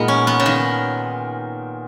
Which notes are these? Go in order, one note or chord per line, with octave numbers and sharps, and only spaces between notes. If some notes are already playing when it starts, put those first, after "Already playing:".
Already playing: A#2 G#3 B3 D#4 A#4
C#4
B3
C#3
D#3